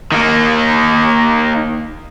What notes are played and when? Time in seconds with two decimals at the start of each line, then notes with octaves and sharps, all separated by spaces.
0.12 D#3 A#3